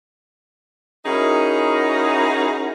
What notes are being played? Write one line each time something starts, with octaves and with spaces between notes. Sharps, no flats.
C#4 D#4 E4 F#4 G#4 A#4